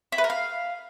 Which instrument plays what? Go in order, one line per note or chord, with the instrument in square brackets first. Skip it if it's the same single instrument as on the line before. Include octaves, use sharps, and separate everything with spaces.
[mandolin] E4
B4
A#4
F5